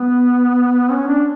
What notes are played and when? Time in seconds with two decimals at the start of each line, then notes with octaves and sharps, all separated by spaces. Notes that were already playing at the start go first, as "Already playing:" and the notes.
Already playing: B3
0.90 C#4
1.07 D4